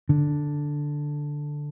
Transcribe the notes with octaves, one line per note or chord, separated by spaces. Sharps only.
D3